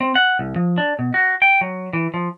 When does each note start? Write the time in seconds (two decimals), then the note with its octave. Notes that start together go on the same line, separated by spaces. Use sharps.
0.01 C4
0.15 F#5
0.39 C2
0.56 F3
0.78 D4
0.99 B2
1.14 F#4
1.42 G5
1.61 F#3
1.93 E3
2.14 F3